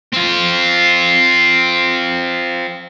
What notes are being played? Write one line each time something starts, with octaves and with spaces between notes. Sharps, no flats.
C4 F4